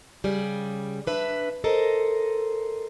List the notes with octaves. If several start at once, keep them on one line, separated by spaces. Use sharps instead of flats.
C#3 G3 G#4 D5
D4 B4 E5
A4 A#4 C5 D#5